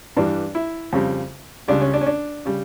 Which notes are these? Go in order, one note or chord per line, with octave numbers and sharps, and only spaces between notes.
G2 E3 G3 D4
E4
F2 C#3 G3
C#2 C#3 G3 D4
C#4
D4
C#4
D4
C#3 G3